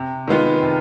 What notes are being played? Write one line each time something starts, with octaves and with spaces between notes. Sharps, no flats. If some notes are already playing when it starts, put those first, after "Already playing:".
Already playing: C3
D#3 G#3 B3 F4
C3